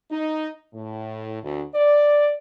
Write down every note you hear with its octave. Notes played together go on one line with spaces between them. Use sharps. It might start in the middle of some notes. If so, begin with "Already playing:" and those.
D#4
A2
D2
D5